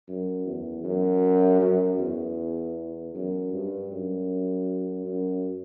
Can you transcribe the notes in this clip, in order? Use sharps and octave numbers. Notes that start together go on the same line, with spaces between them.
F#2
E2
F#2
F#2
E2
F#2
G2
F#2
F#2